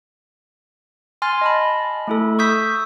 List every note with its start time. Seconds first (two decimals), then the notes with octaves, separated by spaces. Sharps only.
1.22 G#5 C6 F6 A6
1.41 D#5 A5 B5
2.07 A3 E4 A4
2.39 C#6 D#6 E6 G6 B6